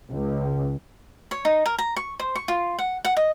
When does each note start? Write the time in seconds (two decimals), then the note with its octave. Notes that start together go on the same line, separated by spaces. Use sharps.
0.10 C#2
1.31 C#5
1.45 D#4
1.66 A#4
1.78 A#5
1.96 C#6
2.20 C5
2.35 C#6
2.48 F4
2.79 F#5
3.05 F#5
3.17 D#5